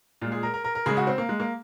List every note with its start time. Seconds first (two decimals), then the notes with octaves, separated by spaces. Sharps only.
0.21 A#2 G#3 F4
0.32 G#4
0.43 A#4
0.54 A#4
0.64 A#4
0.75 A#4
0.86 C#3 G#3 G#4
0.97 F#4
1.07 C4
1.18 A#3
1.29 G#3
1.40 A#3